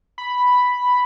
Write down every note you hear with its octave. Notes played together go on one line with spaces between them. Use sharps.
B5